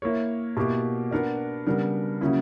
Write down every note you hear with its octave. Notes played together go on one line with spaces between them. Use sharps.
A#3 E4 A#4 C#5
B2 A#3 E4 G4
B3 D4 A#4 D5
C#3 G3 B3 D4 A#4
C#3 F#3 A#3 C#4 E4